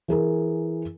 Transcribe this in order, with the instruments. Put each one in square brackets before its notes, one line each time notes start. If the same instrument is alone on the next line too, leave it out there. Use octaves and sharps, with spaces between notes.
[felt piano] E3 G#4 A#4